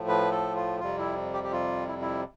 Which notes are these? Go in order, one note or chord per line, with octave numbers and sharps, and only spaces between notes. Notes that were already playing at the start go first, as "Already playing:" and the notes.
Already playing: A2 F3 A3
B4
A4
F4
F2 C3 G3 F4
E4
G4
G4
F4
E4
E4